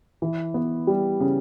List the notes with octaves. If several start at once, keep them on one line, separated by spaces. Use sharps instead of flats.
E3
B3
G3
C#3